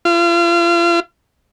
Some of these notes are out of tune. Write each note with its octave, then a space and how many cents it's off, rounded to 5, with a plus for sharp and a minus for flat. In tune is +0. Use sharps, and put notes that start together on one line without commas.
F4 -40